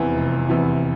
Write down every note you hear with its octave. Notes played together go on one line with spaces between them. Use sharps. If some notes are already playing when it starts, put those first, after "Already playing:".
Already playing: F1 E2 C3 E3
F1
E2 C3 E3